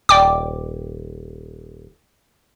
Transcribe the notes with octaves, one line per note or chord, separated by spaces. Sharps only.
D#1 D5 G5 D6